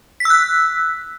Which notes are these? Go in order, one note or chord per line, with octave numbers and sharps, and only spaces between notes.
E6 F#6 B6